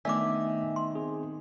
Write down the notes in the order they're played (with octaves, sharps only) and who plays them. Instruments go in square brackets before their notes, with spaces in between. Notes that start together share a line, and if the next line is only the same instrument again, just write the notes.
[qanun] D#3 B3 D4 [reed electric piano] A3 G#5 [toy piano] D5 D6 [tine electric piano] E5
[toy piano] C6
[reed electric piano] C4 [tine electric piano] G#4